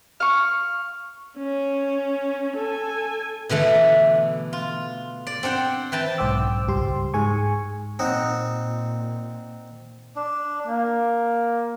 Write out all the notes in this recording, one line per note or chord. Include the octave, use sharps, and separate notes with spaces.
F5 C#6
C#4
A4 G#5
B2 D3 E3 A3
F4
D5
C4 D4 F#5 G5
E3 B4 G5 A5
B1 G#2 C5 G5 D6 E6
C#2 G2 G4 C6
G#2 G#4 G#5 C#6
A#2 C4 D#4 F#5
D4
A#3